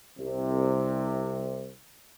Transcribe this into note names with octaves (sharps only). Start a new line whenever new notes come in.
C2 C3